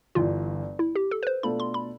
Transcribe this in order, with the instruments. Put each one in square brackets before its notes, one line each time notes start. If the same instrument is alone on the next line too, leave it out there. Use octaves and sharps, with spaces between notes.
[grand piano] G1 G2 E3 [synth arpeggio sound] F4
[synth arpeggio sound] E4
G4
A4
B4
C5
[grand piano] B2 A3 D4 F4 A4 [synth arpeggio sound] B5
[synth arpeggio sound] C6
B5